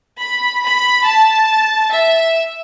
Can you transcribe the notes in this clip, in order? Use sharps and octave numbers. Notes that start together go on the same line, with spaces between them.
B5
B5
A5
E5